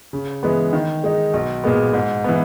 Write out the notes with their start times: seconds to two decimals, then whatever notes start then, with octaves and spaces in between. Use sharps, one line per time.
0.13 C#3
0.43 E3 G#3 B3
0.73 D#3
1.04 G#3 D#4
1.34 B1
1.64 A#2 G#3 B3
1.94 G#2
2.24 E3 B3